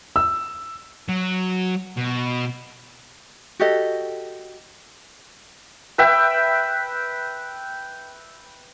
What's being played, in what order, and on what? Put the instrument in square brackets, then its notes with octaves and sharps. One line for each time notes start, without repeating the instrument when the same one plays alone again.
[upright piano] E6
[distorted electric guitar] F#3
B2
[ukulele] F#4 G4 A4 D#5
[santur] B4 E5 G5